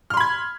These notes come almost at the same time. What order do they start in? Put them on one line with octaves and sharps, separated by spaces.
F6 C6 B5 G#6